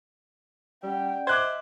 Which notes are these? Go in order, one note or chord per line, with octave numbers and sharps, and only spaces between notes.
G3 C#4 D5 F#5 G5
C5 D#5 E5 D6 F#6 G#6